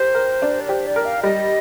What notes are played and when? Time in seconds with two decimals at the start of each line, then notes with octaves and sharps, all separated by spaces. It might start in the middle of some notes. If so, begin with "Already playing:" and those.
Already playing: G4 A#4 C5
0.15 A#4
0.42 D4
0.61 D5
0.69 G4 C5
0.87 D5
0.96 A#4
1.05 F5
1.23 G3 D#5